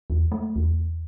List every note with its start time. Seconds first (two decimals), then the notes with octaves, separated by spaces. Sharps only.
0.10 E2
0.32 A3
0.56 E2